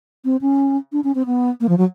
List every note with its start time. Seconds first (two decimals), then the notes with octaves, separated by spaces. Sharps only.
0.25 C4
0.41 C#4
0.92 D4
1.04 C#4
1.15 C4
1.26 B3
1.60 A#3
1.69 F3
1.78 F#3